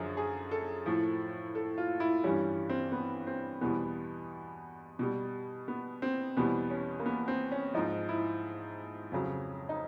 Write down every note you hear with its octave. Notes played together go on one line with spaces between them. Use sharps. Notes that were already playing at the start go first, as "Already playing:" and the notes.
Already playing: F#2 D3 F3 G#4
G#4
A4
A2 F3
A4
F4
E4
G2 E3 G3 C#4
C4
B3
C4
E2 B2 G3 B3
B2 G3
B3
C4
E2 B2 G3 B3
C#4
A#3
B3
C4
C#4
G#2 F3 D#4
E4
F2 C#3 F#3
D#4